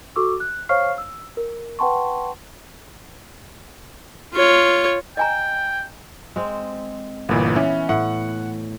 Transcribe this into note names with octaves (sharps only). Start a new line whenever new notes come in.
F#4 A4 C#6 D6 E6
F#6
C5 C#5 F5 C#6 F6 C7
E6
A#4
B4 F#5 G5 A5 C6 C#6
F4 C#5
D#5 G5 G#5 A#5
G#3 C4
G1 A#2 E3 B3
E3 C#4
A2 F#5